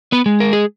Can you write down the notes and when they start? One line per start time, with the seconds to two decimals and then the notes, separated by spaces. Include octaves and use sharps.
0.12 B3 B4
0.26 G#3
0.40 A#4
0.53 G#4